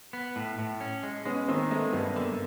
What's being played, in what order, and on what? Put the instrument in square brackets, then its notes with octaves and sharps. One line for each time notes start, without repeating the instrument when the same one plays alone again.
[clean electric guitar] B3
A2
A2
C#4
G#3
[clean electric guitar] G#3 [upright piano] B3 C#4
[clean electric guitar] D#3 [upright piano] A#3 C4
[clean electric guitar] G#3 [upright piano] A3 B3
[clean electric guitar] G2 [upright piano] A3 B3
[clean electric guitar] D3 [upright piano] A#3